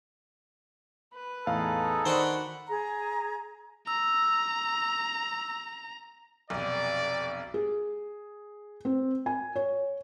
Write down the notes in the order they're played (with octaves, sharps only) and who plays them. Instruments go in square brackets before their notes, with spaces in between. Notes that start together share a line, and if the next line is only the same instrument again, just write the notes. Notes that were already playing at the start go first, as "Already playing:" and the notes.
[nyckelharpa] B4
[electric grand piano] E2 A2 F5 [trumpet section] D#4 G#4 A4
[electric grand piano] D#3 [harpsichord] D4 F#4 C5 [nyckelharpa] F#5 B5
[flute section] G#4 A#5
[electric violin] A#5 [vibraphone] E6
[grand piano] F1 B1 [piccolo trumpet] D5
[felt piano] G#4
C4
G#5
C#5